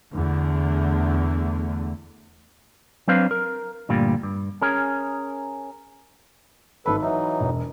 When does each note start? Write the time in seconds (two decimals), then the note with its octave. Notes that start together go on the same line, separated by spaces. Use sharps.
0.13 E2 D3 A3
3.08 F#3 C4 D4 B4 C5 F5
3.31 A#4
3.89 D2 G2 A#2 G3
4.23 G2
4.62 C#4 G#4 A#4
6.86 G#1 A4 B4 B5
7.03 E3 F#3 D#4 E5
7.40 E1